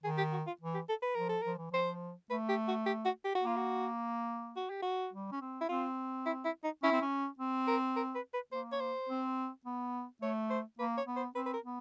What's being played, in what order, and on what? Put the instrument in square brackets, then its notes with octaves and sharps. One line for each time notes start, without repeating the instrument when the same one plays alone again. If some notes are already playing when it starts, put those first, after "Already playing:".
[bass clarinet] D#3 [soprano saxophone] G#4
[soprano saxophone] G4
F#4
F4
[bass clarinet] E3
[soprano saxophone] G4
A4
B4
[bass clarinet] F3 [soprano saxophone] A#4
[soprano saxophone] A4
[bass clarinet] F3 [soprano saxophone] A#4
[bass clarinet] E3
[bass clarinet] F3 [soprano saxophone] C5
[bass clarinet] A3 [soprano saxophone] B4
[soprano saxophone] G4
F#4
G4
F#4
G4
F#4
[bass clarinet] A#3 [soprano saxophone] F4
[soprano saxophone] F#4
F#4
G4
F#4
[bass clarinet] G3
C#4
C4
[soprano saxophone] E4
[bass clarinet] C4 [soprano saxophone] F4
[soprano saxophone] E4
E4
D#4
[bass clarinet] C#4 [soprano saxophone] E4
[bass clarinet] C4
C#4
C4
[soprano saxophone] A#4
A#4
B4
B4
[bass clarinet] A#3 [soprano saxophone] C5
[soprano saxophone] C#5
C5
[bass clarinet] C4
B3
[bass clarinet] A3 [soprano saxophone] C#5
[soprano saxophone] C5
[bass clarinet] A#3 [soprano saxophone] B4
[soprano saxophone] C#5
[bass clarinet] B3
[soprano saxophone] C5
[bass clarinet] C4 [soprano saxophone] B4
[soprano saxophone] B4
A#4
[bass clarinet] B3